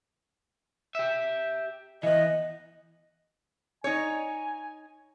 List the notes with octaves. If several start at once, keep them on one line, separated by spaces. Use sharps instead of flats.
G4 E5
E3 B3 D#5
D#4 C#5 G#5